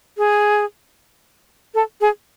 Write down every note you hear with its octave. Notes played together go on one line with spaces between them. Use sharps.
G#4
A4
G#4